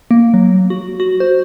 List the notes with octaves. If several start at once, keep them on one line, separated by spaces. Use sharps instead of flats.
A#3
F#3
F#4
F#4
C5